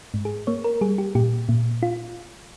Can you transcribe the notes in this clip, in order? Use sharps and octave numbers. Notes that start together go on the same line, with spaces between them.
G#2
G#4
A#3 C#5
A#4
G3 G#4
G4
A#2 G4
A#2
F4